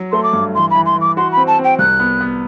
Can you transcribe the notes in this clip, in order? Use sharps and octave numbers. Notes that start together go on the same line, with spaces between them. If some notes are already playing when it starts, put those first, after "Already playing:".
Already playing: F#3
A3 C6
D6
G2
E3 C6
E3 B5
C6
E3
D6
F#4 C6
B5
C4
A5
C4 G5
C2 F#6
B3
B3